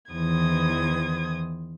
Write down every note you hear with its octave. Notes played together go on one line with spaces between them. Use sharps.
E2 D#3 E3 C5 D#6 G#6